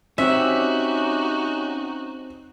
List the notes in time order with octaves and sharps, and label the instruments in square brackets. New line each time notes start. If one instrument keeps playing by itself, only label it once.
[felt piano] C4 [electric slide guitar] C#4 G4 [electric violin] D#4 F#4 [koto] E5